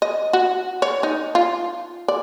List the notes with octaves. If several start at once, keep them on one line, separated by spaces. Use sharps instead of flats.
D#5
F#4
C#5
D#4
F4
D5